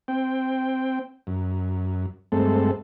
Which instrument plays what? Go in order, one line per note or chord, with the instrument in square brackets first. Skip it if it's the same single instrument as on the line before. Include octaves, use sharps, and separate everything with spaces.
[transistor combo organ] C4 G5
F#2
G2 G#3 A3 C4 A4